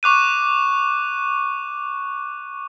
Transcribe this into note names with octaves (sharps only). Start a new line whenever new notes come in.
C#6 D6 F#6 D#7